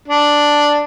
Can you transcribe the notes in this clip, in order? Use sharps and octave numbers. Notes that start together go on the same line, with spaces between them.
D4